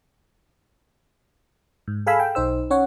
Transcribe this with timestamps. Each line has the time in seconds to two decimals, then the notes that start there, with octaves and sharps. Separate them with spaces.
1.88 G#2
2.07 G#4 A4 F5 G#5 B5 E6
2.20 G5
2.35 B1 D#4 C5 E6
2.70 C#4 C#5 F#5